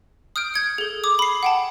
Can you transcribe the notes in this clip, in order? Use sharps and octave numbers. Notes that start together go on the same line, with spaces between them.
D#6 F6 G6 D7
G6 G#6 C#7
G#4 A4
D6 D#6
B5 C7
F#5 G5 A5